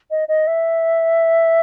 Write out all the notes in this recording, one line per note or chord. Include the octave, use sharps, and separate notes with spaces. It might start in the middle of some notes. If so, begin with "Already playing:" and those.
D#5
D#5
E5